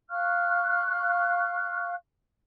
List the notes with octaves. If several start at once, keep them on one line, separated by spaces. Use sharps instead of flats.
F5 C#6 F6 F#6